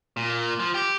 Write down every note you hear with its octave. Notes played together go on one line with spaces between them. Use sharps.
A#2
F3
G4